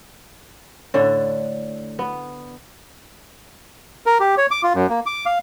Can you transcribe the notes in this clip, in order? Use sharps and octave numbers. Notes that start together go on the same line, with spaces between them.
A2 D3 D4
B3
A#4
G4
C#5
D6
F4
F#2
A#3
D6
F5